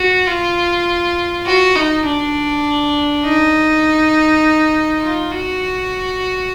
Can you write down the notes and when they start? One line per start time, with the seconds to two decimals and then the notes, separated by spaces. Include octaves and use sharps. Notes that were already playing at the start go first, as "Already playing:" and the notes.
Already playing: F#4
0.28 F4
1.46 F#4
1.76 D#4
2.06 D4
3.24 D#4
5.02 F4
5.32 F#4